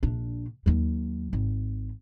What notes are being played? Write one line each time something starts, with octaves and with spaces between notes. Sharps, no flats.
A#1 D4
D#2 F#3
G#1